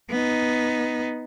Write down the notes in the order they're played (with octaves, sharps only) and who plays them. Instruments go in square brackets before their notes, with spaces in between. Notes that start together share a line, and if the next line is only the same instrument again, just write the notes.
[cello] B3 D#4